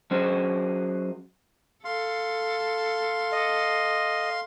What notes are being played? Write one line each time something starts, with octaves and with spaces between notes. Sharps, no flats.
F#3 C#4 F#4 G#4 C5
A4 F5 C6
D#5